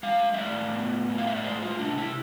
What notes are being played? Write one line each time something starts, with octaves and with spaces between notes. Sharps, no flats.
G#3 F5
E5
A2 D5
B3
A2
F5
E5
D5
G#3 C5
F4
C3 D4
E4